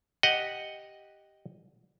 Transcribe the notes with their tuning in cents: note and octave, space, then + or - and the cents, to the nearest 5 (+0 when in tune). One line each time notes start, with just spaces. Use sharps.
G4 +0 D#5 +0 F#5 +0